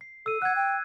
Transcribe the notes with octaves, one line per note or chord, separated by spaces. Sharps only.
C7
A4 E6 D#7
F#5 F#6 G#6
G5